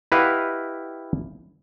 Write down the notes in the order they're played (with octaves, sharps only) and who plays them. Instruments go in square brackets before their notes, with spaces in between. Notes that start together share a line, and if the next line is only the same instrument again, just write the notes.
[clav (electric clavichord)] E4 G4 B4 D#5 F5 F#5